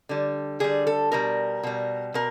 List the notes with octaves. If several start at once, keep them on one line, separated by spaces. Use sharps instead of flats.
D3 G3
D3 G3 G#4
A4
B2 G3 A#4
B2 G3
B2 A#4